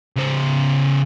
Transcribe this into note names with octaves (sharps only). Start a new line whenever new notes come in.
C#3 C5